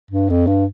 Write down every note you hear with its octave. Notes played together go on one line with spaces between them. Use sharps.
G2
F2
G2